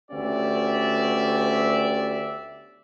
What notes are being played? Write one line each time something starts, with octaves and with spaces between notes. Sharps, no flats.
D2 B3 C#4 G4 D5 E5